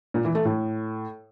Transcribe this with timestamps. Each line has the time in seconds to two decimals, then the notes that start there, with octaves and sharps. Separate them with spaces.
0.14 A#2
0.25 E3
0.35 A3
0.45 A2